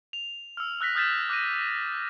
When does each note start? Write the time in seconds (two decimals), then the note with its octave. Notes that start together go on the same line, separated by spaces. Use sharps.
0.13 F7
0.57 E6 F6
0.81 E6 F#6 A#6 B6
0.95 D#6 F6 G6 A6 B6 E7
1.29 D6 F#6 A#6 D#7